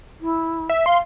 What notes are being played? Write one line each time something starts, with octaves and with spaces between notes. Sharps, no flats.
E4
E5
F5 C6